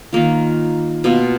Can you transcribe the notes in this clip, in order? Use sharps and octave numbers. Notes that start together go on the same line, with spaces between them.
D#3 A#3 F4
B2 A#3 F4